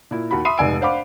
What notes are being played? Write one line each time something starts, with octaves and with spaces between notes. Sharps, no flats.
A#2 E4
D#2 F#4 B5
E5 B5 C6 D#6 C7 D#7
F1 G#2 D5 G#5 E6 D7
D4 C5 F5 F#5 B5 D6